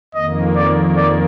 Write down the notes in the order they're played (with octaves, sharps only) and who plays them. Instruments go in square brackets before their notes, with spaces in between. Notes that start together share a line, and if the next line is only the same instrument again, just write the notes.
[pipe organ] F2 D#3 A#3 [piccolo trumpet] D#5
[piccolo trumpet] D5
D5